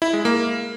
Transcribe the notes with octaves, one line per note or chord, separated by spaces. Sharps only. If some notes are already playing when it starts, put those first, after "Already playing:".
E4
G#3
A#3